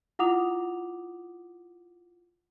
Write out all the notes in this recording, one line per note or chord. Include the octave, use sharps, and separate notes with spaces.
E4 F4 F#5 D6 D#6 F7